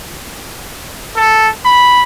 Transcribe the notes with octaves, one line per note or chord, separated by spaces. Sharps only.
A4
B5